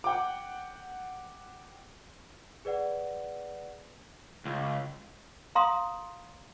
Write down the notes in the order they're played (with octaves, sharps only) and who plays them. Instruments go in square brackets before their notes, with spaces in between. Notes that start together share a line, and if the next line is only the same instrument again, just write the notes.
[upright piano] F#5 G5 D6
[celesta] G#4 B4 D5 F#5
[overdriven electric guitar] C#2
[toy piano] F5 A#5 C6 D#6